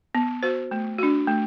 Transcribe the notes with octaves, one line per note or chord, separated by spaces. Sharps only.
B3
F#4 C5
A3
D4 F#4
A3